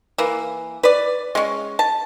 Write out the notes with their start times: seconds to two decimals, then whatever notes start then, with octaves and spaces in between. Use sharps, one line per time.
0.18 E3 A#3
0.83 B4 D5
1.35 G#3 C#4
1.79 A5